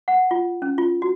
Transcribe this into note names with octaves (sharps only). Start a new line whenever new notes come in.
F#5
F4
C#4
F4
F#4